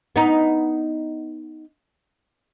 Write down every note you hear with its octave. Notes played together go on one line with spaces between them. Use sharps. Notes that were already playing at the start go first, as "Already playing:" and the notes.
B3 D#4